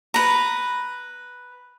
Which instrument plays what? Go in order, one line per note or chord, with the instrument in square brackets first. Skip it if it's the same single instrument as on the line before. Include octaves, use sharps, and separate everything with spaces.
[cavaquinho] B4 A#5